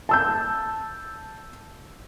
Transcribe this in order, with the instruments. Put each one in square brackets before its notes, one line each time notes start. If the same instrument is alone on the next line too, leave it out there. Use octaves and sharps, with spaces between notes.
[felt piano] A5 E6 G6